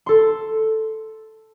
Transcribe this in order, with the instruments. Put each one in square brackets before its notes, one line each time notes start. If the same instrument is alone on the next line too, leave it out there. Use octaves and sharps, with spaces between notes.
[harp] A4 C6